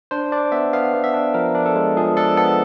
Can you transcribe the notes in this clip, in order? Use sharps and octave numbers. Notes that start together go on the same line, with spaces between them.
D4 C5
D4 D5
B3 E5
B3 F5
B3
E5
D4
F3 A#4
D4
A4
G#3
F3 G#4
D4 A4
B3 A4